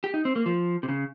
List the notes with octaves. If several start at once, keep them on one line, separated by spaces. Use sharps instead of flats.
G4
D#4
C4
A#3
F3
C3
C#3